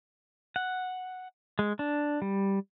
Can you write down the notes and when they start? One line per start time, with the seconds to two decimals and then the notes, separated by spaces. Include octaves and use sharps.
0.56 F#5
1.59 G#3
1.79 D4
2.22 G3